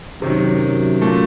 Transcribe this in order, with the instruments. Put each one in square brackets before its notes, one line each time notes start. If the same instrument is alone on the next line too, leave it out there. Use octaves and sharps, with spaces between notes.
[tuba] F#2 [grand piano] C3 D#3 F#3
[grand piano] A#2 A3